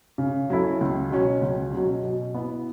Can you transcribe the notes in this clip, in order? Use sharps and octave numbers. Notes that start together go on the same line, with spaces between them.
C#3
F#3 C#4 E4 A4
C#2
B2 F#3 C#4
C#2
B2 F#3 C#4
B2
B3 E4